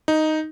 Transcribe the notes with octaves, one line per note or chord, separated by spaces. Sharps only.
D#4